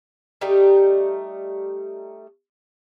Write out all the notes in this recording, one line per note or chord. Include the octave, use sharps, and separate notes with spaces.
G3 A3 D#4 G4